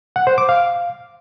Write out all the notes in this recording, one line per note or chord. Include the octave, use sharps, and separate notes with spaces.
F#5
C5
D6
F5